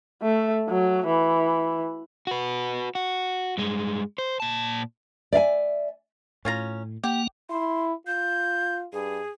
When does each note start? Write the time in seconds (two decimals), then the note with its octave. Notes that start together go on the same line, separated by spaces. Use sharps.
0.23 A3
0.69 F#3
1.07 E3
2.27 F#4 B4
2.95 F#4
3.58 G2 G#3
4.18 C5
4.40 A#2 A5
5.32 D5 E5 F5 G#5
6.45 A2 C#4 F4 A#5
7.04 A#3 G4 F#5
7.50 E4 C6
8.07 F4 G6
8.93 G2 G#4